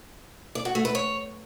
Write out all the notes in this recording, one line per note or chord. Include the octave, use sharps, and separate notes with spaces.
D5
F#4
A3
B4
C#5